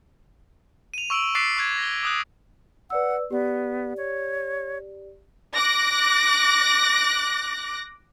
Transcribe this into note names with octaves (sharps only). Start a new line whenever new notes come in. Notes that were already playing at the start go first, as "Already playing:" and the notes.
D#7 F7
C#6 E6 D7 D#7 F#7
D6 F#6 A6 B6 C7 D7
C#6 F#6 G#6 C7
A#6 G7
D6 D#6 F#6
B4 D5 F#5 E6
B3 G4 D5
C#5
D6 F#6 A#6